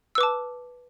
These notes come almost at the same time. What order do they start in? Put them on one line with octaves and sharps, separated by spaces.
E6 B4 D6 A5